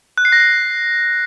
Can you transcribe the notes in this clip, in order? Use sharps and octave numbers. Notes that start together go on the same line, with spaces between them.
F#6
C7
A#6
C7